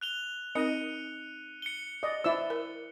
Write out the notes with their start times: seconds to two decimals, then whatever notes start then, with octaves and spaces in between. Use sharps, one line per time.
0.01 F#6 F7 G7
0.55 C4 D#4 A#4 D#5 C#7 D#7
1.62 C#7 G7
2.03 D5 D#5
2.24 E4 C5 D5 E5 E6
2.50 A#4